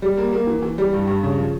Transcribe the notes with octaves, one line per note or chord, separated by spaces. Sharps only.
G3
A#3
A#3
E3
E3
G3
G2
G2
C#3
F3